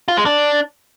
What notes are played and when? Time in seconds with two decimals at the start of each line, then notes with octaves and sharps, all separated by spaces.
0.08 F4
0.17 G#3
0.26 D4